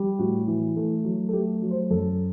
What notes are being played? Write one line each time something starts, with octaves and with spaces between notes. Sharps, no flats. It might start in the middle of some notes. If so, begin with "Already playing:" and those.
Already playing: G3
A2 F#4
E3
A3
F#3
A4
A3 G4
F#3
C5
F#2 A4